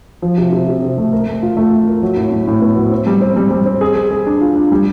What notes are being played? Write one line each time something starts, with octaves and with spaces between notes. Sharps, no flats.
F3
C3
C3
C3
C3
A3
A#4
A3
F4
A3
F4
A#4
F#3
A2
A2
A2
B3
F#3
C4
G3
C4
G3
G3
C4
G#4
G#4
G#4
D4
F4
D4
G3